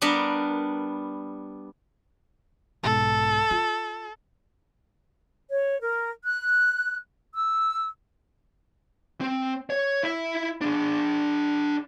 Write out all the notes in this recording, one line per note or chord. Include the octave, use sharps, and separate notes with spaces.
G3 B3 D4 A#4
B1 G#2 A4
F4
C#5
A#4
F#6
E6
C4
C#5
E4 E5
D4 G#4